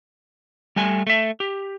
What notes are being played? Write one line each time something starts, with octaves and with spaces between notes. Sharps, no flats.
G3 A3 G#5
A3 E5
G4